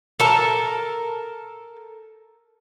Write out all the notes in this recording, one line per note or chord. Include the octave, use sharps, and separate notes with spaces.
A4 A#4 A5